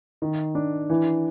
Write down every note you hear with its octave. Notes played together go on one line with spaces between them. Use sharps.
D#3
D4
E3